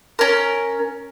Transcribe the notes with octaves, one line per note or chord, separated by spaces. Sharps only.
C#4 A#4